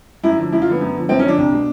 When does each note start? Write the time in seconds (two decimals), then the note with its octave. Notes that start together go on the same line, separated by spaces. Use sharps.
0.24 F#2 E4
0.37 D3 F3
0.52 F#2 E4
0.62 F4
0.67 D3 F3 B3
0.81 F#2
0.95 D3 F3
1.09 F#2 C4
1.19 C#4
1.23 D3 F3 D4
1.38 C2
1.52 B2